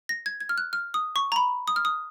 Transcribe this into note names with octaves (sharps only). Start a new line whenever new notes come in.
A#6
G#6
G#6
F6
F#6
F6
D#6
C#6
A#5
B5
D#6
F6
D#6